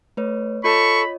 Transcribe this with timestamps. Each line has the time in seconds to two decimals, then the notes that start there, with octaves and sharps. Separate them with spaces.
0.17 A3 B4 C#5
0.64 F4 A4 C#5 D#5 B5 C#6